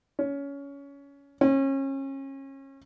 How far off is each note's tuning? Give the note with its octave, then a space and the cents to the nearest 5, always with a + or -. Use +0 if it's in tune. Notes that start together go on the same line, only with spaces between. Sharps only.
C#4 +20
C#4 -30